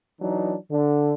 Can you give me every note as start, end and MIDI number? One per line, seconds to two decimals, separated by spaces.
0.20 0.55 52
0.20 0.55 54
0.20 0.55 62
0.20 0.55 63
0.71 1.14 50